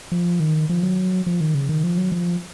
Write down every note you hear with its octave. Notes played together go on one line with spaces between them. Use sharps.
F3
D#3
F3
F#3
F3
D#3
C#3
D#3
F3
F#3
F3